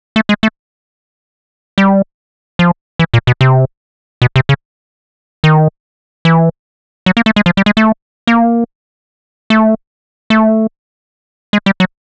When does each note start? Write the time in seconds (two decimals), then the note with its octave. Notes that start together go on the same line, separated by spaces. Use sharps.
0.16 A3
0.29 G#3
0.43 A3
1.78 G3
2.59 F3
2.99 E3
3.14 A#2
3.27 B2
3.41 C3
4.22 B2
4.36 C3
4.49 C#3
5.44 D#3
6.25 E3
7.06 F#3
7.17 A#3
7.26 A3
7.36 G#3
7.46 F3
7.57 G3
7.66 G#3
7.77 A3
8.27 A#3
9.50 A3
10.30 A3
11.53 G#3
11.66 G3
11.80 F#3